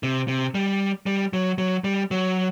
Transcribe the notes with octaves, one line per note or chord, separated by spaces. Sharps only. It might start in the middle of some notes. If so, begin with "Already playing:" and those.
C3
C3
G3
G3
F#3
F#3
G3
F#3